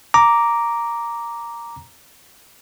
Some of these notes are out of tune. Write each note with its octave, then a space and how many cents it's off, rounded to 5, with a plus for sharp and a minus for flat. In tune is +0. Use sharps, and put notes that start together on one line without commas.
A#5 +0 D6 -5